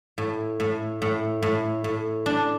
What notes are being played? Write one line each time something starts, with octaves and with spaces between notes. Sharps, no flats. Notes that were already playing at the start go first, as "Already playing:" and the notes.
A2
A2
A2
A2
A2
D4